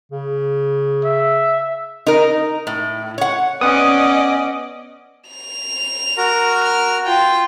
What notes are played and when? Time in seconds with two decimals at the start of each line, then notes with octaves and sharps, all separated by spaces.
0.11 C#3
1.05 E5
2.07 D#4 A#4
2.67 A2
3.18 C#5 F#5
3.61 B3 C#4 D5 D#5 F#5 D#6
5.28 F7
6.17 F#4 A#4 A#5
6.64 F6
7.06 F4 G5